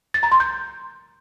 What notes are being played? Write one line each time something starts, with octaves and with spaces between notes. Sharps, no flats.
A6
A#5
C6
G6